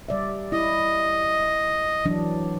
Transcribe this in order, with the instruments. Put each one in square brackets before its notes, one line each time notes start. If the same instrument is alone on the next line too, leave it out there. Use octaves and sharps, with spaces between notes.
[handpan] G3 D5 E5
[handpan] E4 [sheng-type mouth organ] D#5
[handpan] E3 F#3 D4